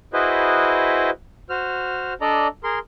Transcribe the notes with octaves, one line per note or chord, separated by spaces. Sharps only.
E4 F#4 G#4 B4 C5 D#5
F#4 C5 F6
D4 A4 D5 D#5 A#5
G#4 A#4 C6